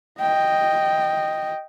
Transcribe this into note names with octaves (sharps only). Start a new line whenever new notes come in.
D#5 G5